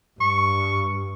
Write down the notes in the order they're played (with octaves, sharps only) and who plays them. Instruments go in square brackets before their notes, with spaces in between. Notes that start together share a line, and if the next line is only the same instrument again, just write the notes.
[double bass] G2 [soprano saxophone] C#6